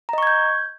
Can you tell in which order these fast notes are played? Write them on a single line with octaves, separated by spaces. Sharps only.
A#5 D#5 C#6 G#6 G6